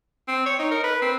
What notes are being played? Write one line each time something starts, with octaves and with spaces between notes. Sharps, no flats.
C4
C#5
D#4
A#4
B4
C4